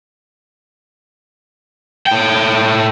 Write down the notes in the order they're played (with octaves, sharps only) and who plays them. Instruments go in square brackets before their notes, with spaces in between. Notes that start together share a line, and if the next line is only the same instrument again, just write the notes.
[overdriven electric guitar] A2 G5